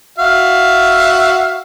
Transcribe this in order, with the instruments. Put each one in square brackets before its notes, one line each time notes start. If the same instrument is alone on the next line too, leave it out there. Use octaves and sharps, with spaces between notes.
[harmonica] F#4 E5 F5